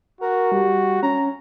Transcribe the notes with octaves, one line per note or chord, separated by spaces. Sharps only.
F#4 A#4
G3
C#4 A#5